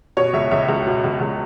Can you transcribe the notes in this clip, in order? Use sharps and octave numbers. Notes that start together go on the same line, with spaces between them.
B2 C#5
C#2 E5
C#2 E5
C#2
B2
C#2
C#2